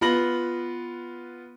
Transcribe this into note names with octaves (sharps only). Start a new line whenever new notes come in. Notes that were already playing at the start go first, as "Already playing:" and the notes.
B3 F4 B5 A#6 F#7